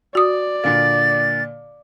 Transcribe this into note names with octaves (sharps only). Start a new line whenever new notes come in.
F#4 D5 D#6
A#2 D3 A#3 A6